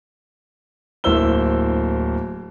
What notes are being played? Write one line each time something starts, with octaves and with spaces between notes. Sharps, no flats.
D1 A#3 E4 C5 E6 G7